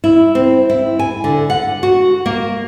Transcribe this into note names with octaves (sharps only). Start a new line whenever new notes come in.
E4
C4
E4
G#5
D3
F#5
F#4
A#3